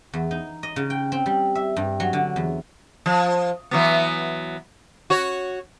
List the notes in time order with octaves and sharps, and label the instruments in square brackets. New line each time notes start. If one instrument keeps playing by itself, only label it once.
[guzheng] E2
D#4
D#5
C#3
G5
C4
G3
E5
G2
F#3
D3
E2
[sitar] F3
E3 F#3 B3
F#4 C#5